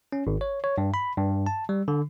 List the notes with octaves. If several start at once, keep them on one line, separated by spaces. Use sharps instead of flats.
C#4
G#1
C#5
C#5
G2
B5
G2
A5
G3
D3